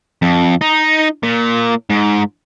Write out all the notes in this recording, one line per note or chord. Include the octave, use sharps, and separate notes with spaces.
F2
D#4
A#2
G#2